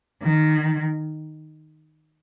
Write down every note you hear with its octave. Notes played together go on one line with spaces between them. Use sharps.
D#3